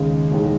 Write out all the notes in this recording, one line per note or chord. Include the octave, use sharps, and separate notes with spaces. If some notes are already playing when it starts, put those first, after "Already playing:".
Already playing: D#2 C#3 G#3
E1 D#2 D#3 G#3